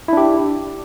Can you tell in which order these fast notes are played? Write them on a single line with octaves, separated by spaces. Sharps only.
E4 D4 G4